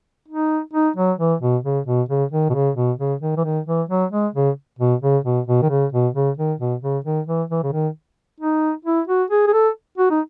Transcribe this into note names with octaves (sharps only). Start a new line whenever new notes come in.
D#4
D#4
F#3
E3
B2
C#3
B2
C#3
D#3
B2
C#3
B2
C#3
D#3
E3
D#3
E3
F#3
G#3
C#3
B2
C#3
B2
B2
D#3
C#3
B2
C#3
D#3
B2
C#3
D#3
E3
E3
C#3
D#3
D#4
E4
F#4
G#4
G#4
A4
F#4
D#4